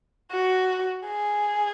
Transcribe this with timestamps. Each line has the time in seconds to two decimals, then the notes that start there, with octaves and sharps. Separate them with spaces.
0.32 F#4
1.06 G#4